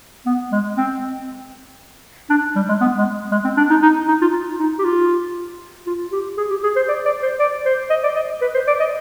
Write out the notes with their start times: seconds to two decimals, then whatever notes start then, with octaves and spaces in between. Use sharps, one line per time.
0.26 B3
0.52 G#3
0.77 C4
2.30 D4
2.56 G3
2.69 G#3
2.81 B3
2.98 G#3
3.32 G#3
3.44 C4
3.57 D4
3.70 D#4
3.83 D#4
4.08 D#4
4.21 F4
4.59 D#4
4.79 G4
4.84 F4
5.86 F4
6.12 G4
6.38 G#4
6.50 G4
6.63 G#4
6.76 C5
6.88 D5
7.05 D5
7.22 C5
7.39 D5
7.65 C5
7.90 D#5
8.03 D5
8.16 D#5
8.41 B4
8.54 C5
8.67 D5
8.80 D#5